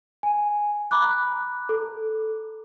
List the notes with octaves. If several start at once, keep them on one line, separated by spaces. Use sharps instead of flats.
G#5
A#5 B5 D6 F#6
A4